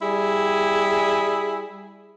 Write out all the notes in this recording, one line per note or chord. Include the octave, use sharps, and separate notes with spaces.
G3 E4 G#4